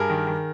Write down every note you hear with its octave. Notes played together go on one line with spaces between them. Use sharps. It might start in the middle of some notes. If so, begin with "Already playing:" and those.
Already playing: G2 G#4 A#4
D#3
D#3